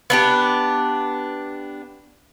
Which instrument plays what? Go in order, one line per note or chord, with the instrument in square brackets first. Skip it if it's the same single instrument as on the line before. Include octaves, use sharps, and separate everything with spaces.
[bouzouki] B3 D4 G4